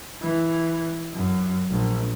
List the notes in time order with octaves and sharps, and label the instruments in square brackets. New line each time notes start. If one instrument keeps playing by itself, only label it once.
[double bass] E3
F#2
A#1